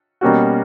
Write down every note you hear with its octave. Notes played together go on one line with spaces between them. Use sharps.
B2 G3 A#3 C#4 F#4